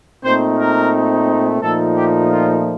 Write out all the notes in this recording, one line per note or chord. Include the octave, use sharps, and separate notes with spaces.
A#2 A3 C4 D#4 C5
A#4
A#2 F3 A3 D#4 A4
G4
F4